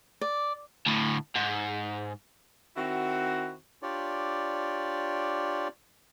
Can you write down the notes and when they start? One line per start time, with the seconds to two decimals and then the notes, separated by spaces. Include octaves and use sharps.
0.21 D5
0.86 D2 A2
1.36 G#2
2.77 D#3 C4 E4 F#4
3.83 D4 F4 G4 C#5 D5